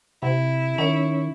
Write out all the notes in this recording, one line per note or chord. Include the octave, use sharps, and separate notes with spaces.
C3 E4
D#3 C#4 C#5